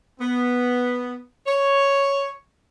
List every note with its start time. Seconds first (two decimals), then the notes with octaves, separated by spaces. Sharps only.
0.20 B3
1.46 C#5